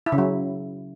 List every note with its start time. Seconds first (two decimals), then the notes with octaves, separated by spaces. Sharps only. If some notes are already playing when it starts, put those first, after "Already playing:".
0.06 E4
0.12 C#3
0.18 F#3